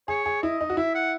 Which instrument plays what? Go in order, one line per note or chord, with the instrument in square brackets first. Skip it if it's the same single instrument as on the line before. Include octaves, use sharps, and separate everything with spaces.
[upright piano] G#4 [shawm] C#5
[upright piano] G#4
[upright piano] E4 [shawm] D#5
[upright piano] D#4
F#4
[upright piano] E4 [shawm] E5
[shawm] F#5